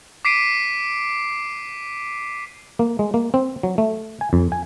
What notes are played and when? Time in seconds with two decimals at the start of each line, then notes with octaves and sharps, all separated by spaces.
0.25 D6 B6 C7 D7 D#7
2.79 A#3
2.99 G#3
3.14 A#3
3.34 C4
3.63 F#3
3.78 A3
4.21 G#5
4.33 F2
4.52 G#5